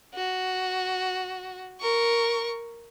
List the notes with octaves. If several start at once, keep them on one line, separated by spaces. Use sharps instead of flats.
F#4
A#4 C#6